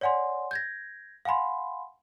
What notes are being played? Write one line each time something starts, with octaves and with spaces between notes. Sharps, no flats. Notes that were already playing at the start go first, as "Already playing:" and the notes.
C#5 D5 F#5 G#5 C6
G6 G#6 A#6
F5 F#5 G#5 B5 C6